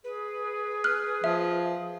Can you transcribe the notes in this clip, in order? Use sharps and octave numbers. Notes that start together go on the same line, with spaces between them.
G#4 B4
F6 F#6
F3 E5